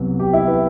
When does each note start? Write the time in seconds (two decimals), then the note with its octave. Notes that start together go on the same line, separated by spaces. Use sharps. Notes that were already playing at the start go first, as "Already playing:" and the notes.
Already playing: C2 C3 F#3 B3
0.20 G4
0.33 E4
0.47 B4